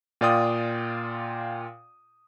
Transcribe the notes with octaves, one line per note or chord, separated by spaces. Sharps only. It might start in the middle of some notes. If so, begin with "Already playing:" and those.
A#2 F4 D5 G5 D#6